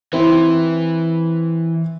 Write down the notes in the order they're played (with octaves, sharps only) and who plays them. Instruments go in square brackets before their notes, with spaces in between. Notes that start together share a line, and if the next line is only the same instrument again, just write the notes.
[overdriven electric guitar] E3 [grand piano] C4 E4